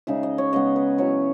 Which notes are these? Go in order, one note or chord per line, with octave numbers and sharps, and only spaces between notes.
C#3 G#3 D#4 E5
D#5
C#5
C#3 G#3 B3 D#5
B4
F#3 C#4 E4 C#5